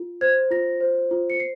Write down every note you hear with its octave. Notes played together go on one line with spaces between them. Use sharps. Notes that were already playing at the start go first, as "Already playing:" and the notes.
Already playing: F4
C5 G#6
F4 A#6
C5
F4
C#7
C7